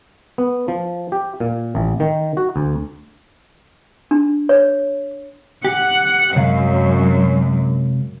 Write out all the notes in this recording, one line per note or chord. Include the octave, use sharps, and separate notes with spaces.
B3
F3
G4
A#2
A1
D#3
F#4
D2
D4
C#5
G4 F#5
F#2 C3 G#3 F5